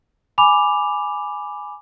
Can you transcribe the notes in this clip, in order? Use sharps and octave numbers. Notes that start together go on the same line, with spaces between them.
G#5 B5 D6 F7